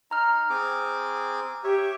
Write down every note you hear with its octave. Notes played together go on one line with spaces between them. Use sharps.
D#4 A#5 F6
C4 G#4 D6
G4 C#5 E5